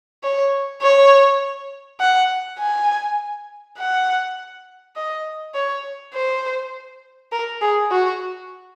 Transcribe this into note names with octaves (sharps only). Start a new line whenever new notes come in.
C#5
C#5
F#5
G#5
F#5
D#5
C#5
C5
A#4
G#4
F#4